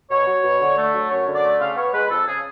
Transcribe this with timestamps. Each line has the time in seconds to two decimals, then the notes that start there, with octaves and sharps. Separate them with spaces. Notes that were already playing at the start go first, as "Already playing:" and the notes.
0.11 B2 C#5
0.27 F#3
0.44 B2
0.60 D3
0.77 A3
0.94 F#3
1.10 F#2 C#5
1.27 D3
1.35 D5
1.44 A3
1.60 C#3 F5
1.76 B3 C#5
1.93 G#3 B4
2.10 F2 A4
2.27 C#3 G#4